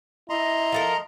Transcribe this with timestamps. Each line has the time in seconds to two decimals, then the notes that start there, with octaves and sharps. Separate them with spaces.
0.29 E4 D#5 A#5 C6
0.72 F3 A4 A#4